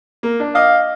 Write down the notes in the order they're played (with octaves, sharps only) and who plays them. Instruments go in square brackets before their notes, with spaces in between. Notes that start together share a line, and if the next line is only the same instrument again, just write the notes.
[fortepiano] A#3
D4
[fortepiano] D#5 D6 D#6 [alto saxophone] F5